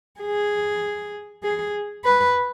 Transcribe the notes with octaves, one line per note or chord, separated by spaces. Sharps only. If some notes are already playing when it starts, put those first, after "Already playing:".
G#4
G#4
B4